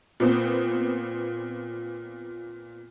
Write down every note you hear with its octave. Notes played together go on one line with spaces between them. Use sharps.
A#2 B3 C4